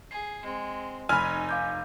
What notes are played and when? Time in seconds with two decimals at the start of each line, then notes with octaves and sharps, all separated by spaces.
0.11 G#4 C7
0.43 G#3 C4
1.09 F1 D#4 G#5 B5 F6
1.49 F5 D6 G6